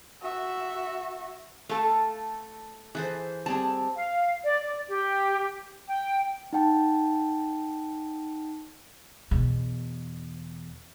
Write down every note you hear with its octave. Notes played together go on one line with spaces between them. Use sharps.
F#4 E5
A3 A4 F5
E3 G#4 A4 C5
G3 C4 G#4 A5
F5
D5
D5
G4
G5
D#4 F#5 G5 A5
E2 B2